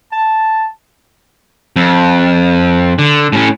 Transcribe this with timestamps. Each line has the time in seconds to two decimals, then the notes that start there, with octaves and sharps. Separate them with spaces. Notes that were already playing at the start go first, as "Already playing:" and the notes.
0.11 A5
1.76 F2
2.99 D3
3.33 A2 C#4